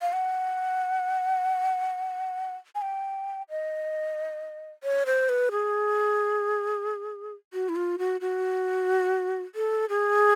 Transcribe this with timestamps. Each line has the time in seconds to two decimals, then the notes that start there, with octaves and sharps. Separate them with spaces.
0.02 F5
0.13 F#5
2.75 G#5
2.82 G5
3.50 D#5
4.84 C#5
5.06 C5
5.29 B4
5.51 G#4
7.53 F#4
7.69 E4
7.76 F4
7.99 F#4
8.21 F#4
9.55 A4
9.89 G#4